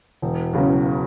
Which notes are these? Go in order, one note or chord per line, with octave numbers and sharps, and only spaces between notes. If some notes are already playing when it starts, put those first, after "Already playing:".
E1
E2 C#3 F#3 C#4